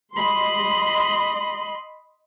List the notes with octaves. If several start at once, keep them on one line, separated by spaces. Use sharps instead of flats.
D#5 B5 C6